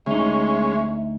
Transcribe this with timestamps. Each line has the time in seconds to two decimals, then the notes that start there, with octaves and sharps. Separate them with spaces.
0.06 D2 G#3 C#4 D#4 E5